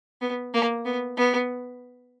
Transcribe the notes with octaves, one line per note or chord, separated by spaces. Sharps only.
B3
A#3
B3
B3